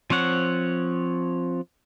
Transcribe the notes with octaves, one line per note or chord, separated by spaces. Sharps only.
F3 C4 C#5 F#5